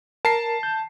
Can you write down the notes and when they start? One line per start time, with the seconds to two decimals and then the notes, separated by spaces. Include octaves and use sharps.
0.25 A#4 A5 C7
0.63 G6